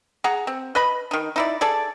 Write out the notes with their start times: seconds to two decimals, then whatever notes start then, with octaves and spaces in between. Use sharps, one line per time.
0.24 G#4 F#5 A#5
0.47 C4
0.75 B4 D#5 B5
1.11 D#3 D#4
1.36 D#4 E4 D5
1.61 G#4 A4 D5